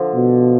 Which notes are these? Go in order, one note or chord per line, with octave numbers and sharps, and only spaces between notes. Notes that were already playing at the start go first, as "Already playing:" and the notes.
Already playing: D3 F3
B2